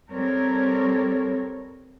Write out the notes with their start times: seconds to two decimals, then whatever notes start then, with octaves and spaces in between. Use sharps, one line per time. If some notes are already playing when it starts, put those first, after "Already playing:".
0.11 G3 C4 A4 A#4 C#5